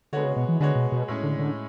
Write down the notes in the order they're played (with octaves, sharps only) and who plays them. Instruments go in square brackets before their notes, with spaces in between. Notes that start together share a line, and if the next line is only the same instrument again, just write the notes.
[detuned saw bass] D3 [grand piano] G#3 B3 F#4 C#5
[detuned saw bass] C#3
B2
E3
[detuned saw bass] D3 [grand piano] G#3 B3 F#4 C#5
[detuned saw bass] B2
B2
[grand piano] A2 G#3 C#4
[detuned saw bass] D3
D3